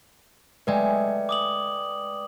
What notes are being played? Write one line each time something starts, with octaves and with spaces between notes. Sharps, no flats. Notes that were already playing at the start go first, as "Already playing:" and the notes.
G#3 A3 B4 D5 G5
D6 D#6 F#7